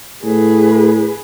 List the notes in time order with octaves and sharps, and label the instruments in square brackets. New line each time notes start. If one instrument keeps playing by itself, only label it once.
[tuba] A2 [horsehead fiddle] G#4 B4